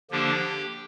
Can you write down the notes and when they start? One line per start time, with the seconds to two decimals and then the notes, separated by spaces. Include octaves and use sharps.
0.11 D3 F3 A#3 D4 G4